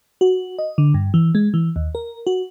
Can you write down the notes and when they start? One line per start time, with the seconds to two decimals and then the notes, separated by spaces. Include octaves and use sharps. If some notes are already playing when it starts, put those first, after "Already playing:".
0.21 F#4
0.59 D#5
0.78 D3
0.94 G2
1.14 E3
1.35 G#3
1.54 E3
1.76 D#2
1.95 A#4
2.27 F#4